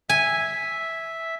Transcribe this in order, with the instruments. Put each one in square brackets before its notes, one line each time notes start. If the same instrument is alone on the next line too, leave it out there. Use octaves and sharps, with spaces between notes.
[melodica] E5 [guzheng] G#5